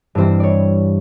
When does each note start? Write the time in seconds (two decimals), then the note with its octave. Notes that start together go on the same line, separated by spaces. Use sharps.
0.15 G2 E3 G3 C4 C5
0.40 C#5 D5